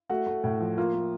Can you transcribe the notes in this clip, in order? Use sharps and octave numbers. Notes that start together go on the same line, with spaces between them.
A3 F#4
A3
A2
F3
A#3 F4
A#3